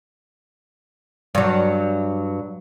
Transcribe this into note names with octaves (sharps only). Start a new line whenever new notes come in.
G2 F#3